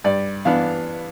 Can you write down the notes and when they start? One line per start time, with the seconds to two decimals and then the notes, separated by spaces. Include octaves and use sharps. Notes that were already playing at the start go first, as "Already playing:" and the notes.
0.04 G2 D5
0.45 E3 B3 D4 F5